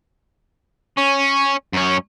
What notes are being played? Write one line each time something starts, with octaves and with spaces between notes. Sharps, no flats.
C#4
F#2 C#4